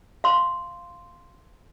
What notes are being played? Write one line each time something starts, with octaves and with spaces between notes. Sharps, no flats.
F5 C6